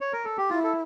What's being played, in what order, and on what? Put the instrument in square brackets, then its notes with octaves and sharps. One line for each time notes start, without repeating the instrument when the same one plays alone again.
[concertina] C#5
A#4
A4
G4
[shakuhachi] E4 [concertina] F4
[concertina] A4